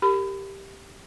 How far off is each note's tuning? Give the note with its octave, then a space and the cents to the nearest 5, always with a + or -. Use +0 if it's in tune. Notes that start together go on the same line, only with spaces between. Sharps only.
G4 +0 A#4 -20 B5 +25